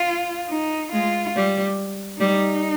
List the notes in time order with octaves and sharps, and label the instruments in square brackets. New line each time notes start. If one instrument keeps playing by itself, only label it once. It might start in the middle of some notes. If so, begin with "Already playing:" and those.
Already playing: [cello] F4
D#4
[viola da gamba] G#3 [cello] F4
[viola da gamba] G3
[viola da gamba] G3 [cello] D#4